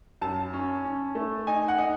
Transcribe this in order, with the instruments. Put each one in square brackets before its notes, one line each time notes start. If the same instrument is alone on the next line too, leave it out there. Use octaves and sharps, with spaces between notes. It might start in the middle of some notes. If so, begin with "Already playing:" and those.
[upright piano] F#2 A5
C#4
C#4
A3
D#4 G#5
F#5
D#4